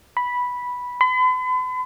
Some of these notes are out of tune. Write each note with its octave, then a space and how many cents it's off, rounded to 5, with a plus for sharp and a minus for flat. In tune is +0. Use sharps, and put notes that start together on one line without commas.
B5 -5
B5 +45